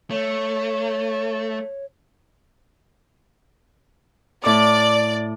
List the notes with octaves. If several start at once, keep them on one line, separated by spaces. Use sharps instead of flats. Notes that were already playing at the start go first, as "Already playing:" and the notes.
A3 C#5
A2 D5 D6